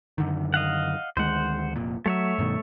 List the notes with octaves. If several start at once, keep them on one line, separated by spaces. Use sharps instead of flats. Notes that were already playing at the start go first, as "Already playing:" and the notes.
F#2 D3 D#3
D#5 F5 F#5
D2 D#3 G#3 C5 F#5
F1 A#2
F#3 A3 C#5 E5
G2 B2 D#3